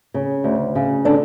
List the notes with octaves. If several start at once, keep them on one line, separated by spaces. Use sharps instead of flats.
C#3
D2
C#3
D3 D4